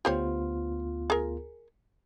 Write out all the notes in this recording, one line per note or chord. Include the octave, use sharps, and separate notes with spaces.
D2 B3 F4 G4 C5 C#5
G#4 A#4